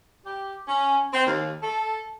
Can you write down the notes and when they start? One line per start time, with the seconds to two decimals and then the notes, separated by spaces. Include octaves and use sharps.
0.25 G4
0.68 C#4
1.13 C4
1.26 D#2
1.62 A4